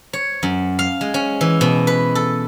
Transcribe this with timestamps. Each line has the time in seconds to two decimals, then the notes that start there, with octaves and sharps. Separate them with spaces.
0.13 C#5
0.43 F#2
0.79 F5
1.01 G#3
1.14 C#4
1.41 E3
1.61 B2
1.87 B4
2.15 A4